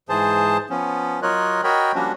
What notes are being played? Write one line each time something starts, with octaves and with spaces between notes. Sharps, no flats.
G#2 E3 G#4 C5 A5
F3 B3 C#4
F#3 F4 A#4 C#5 D#5 F#6
F#4 A#4 C#5 D#5 G5 B5
F3 G3 A#3 C#4 D4 F#4